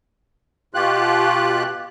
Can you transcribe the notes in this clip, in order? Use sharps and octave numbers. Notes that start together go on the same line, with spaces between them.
B2 F4 G4 F#6